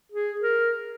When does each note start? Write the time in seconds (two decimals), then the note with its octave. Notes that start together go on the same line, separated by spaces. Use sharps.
0.12 G#4
0.41 A#4